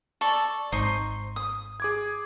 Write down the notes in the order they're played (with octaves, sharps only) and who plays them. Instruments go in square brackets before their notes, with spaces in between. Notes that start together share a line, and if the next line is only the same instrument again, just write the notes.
[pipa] A4 [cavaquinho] D5 C#6
[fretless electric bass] G#1 [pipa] D#4 [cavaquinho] C5 C6 C#6
[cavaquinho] D#6
[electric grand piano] G#4 D6 G#6